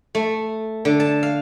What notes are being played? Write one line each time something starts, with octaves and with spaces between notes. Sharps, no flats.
A3
D3
A5
F5